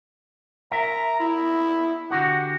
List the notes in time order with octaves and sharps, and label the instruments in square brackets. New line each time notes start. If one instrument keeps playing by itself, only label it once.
[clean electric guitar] A#4 E5 [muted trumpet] A#5
[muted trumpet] E4
[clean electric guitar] D3 F#4 G4 [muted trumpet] F#5